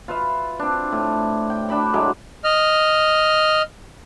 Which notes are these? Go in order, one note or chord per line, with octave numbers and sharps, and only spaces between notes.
F4 B4 E5
C4 D4
A2
G5
D4 E5 B5 D6
A2 F#3 G#3 D6
D#5 F6